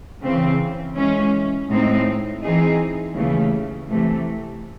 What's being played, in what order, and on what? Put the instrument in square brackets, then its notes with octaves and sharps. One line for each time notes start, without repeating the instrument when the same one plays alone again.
[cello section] C#3 E3 C4
E3 G#3 C#4
A2 G#3 C4 D#4
E3 C4 D#4 G#4
D#2 C#3 E3 A3
C3 E3 A3